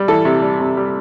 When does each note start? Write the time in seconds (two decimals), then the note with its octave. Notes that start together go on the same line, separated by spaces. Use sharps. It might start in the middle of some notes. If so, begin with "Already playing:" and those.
Already playing: G3
0.08 E3 A4
0.25 C3
0.42 G3
0.60 C3
0.77 G3